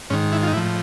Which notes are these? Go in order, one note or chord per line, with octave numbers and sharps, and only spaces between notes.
G#2 D#3 C#4
E4
F4
D#4
A2 F3 E4